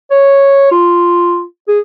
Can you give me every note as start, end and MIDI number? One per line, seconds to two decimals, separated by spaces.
0.11 0.71 73
0.72 1.43 65
1.68 1.80 68